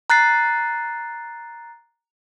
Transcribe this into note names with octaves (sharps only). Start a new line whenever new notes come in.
A#5 F#6 A6 C7